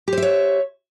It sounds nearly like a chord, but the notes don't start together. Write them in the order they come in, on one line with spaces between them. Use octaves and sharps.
G4 C5 E5 C#5